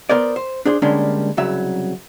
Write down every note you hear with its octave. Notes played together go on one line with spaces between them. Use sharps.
B3 A#4 C5 D5
C5
D4 G#4 C5
D3 G3 G#3 A#3 C#4 D4
C2 C#3 F#3 E5